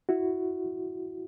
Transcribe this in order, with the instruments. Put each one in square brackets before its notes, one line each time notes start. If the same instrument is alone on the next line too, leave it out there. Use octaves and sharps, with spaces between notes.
[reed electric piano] E4 F#4